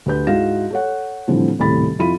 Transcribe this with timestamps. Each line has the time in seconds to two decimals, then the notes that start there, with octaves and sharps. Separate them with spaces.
0.06 D2 G4 B4 G6
0.27 G#2 E4 F#4 F5 A#6 E7
0.71 A4 C#5 F#5
1.28 A2 D3 E3 F3 G3 C4
1.59 D#1 A2 C3 B5 A6
1.99 F2 E4 F4 B5 D#7